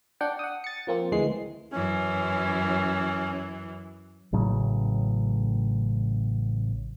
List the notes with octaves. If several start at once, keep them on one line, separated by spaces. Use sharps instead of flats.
D4 F#5 G5
F#5 D#6
A6 C#7
F3 A#3 C4
D2 E3 G#3 C7
F#2 E3 C#4
A1 A2 C#3 F#3